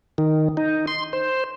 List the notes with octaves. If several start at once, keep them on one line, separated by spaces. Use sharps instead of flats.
D#3
D#4
C6
C5